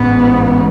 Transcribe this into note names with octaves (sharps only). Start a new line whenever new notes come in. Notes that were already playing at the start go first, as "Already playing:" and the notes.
Already playing: A1 G#2 B3